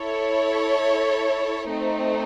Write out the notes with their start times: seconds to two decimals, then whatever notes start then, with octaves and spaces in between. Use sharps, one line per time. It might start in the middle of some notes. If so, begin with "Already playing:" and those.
Already playing: E4 A4 C#5
1.70 A3 C4 D#4